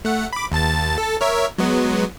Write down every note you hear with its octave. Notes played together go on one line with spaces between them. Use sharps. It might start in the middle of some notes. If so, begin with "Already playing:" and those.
A3 F#5
B5 D6
D#2 A5 A6
A4 A6
A#4 C#5 E5
F#3 G#3 B3